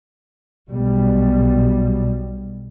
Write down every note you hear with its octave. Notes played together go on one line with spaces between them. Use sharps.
B1 B2 G3